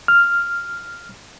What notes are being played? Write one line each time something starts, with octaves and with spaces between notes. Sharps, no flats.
F6